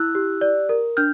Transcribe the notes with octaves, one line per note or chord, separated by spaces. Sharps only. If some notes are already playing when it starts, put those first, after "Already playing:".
Already playing: E4 E6 F#6
G4
D5
A#4
D4 F6 G6